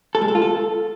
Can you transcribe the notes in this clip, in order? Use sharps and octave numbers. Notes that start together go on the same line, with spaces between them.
A4
G#3
A4
F4
A4